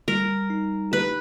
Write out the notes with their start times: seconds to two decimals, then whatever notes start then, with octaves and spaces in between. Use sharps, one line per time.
0.08 G3 A#4
0.50 D#4
0.92 G4 B4